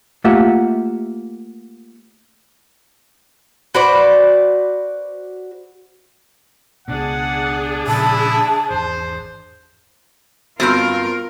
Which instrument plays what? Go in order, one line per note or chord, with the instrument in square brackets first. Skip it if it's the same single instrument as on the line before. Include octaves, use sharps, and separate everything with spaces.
[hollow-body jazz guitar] A3 A#3 F4 G4 E5 F#5
[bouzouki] F#4 B4 C5 D5
[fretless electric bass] C#2 B2 [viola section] D4 G#4 [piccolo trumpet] F#5
[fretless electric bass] A#2 C#3 F3 [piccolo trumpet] E4 [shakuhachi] A5
[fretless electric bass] G#1 E2 [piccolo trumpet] C5
[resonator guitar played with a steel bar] G2 A#2 C4 [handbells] B3 F#4 G6 [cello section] F4 A#4